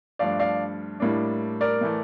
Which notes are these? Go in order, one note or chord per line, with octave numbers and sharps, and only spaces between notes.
G2 F3 A3 D4 D5 F5
D5 F5
A2 G3 A#3 D4
A#4 D5
A2 E3 A3